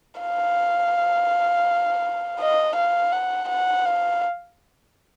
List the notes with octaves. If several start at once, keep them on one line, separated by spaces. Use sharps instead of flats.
F5
D#5
F5
F#5
F#5
F5